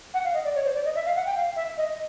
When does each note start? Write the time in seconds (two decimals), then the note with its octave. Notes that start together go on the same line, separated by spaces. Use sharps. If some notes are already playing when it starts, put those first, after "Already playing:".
0.14 F#5
0.24 F5
0.34 D#5
0.45 D5
0.55 C#5
0.65 C5
0.75 D5
0.85 D#5
0.95 E5
1.06 F5
1.16 F#5
1.26 G5
1.37 F5
1.56 E5
1.77 D#5